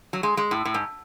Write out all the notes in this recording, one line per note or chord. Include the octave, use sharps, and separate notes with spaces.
F#3
G#3
G#3
A2
A2
G#2